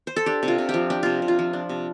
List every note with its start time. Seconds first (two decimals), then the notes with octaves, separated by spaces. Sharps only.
0.07 C5
0.16 A4
0.26 D4 G4
0.43 C3
0.48 F4
0.58 C3
0.69 G4
0.74 F3
0.90 D4 G4
1.03 C3 F4
1.22 C3
1.28 F4
1.39 F3
1.53 D4
1.69 C3